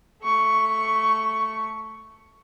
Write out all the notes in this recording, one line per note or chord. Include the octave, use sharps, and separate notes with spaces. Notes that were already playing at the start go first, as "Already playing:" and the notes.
A3 C#6